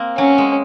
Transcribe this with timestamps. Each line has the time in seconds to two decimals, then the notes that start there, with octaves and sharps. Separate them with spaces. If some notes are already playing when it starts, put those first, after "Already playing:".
Already playing: A#3 C4
0.18 F#3 C#4
0.38 G#3